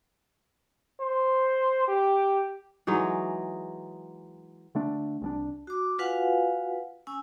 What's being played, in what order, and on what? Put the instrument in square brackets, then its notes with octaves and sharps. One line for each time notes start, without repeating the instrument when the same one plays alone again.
[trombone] C5
G4
[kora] E3 F#3 G#3 D#4
[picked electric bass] D3 A3 D4
C2 F3 D4
[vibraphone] F#4 D6
F4 F#4 B4 F5 F#5 G#5
C#4 G#5 E6